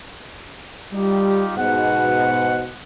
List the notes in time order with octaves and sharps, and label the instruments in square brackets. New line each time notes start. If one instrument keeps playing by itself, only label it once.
[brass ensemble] G3 [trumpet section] D#4 F4 G4
[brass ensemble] G#2 B2 [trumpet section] F#5